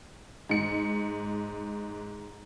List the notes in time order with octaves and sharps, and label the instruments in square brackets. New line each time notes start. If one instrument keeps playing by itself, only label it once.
[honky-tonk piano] G#2 C#7